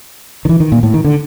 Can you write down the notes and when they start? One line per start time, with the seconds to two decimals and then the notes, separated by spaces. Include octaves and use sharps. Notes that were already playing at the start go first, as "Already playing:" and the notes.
0.45 D#3
0.49 E3
0.60 D#3
0.72 A#2
0.83 A2
0.94 D#3
1.04 D3